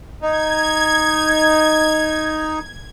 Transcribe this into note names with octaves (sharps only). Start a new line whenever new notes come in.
D#4 G#6